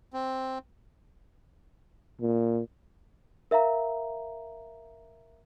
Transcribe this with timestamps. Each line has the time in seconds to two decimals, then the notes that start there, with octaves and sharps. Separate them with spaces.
0.13 C4
2.21 A#2
3.51 A#4 E5 F5 A#5